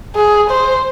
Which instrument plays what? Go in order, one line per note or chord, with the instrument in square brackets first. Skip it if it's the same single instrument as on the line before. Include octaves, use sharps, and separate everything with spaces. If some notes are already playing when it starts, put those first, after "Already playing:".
[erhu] G#4
C5